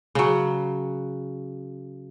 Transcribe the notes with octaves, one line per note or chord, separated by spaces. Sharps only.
C#3 F#3